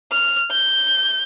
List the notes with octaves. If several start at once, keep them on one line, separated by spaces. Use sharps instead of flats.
F6
G6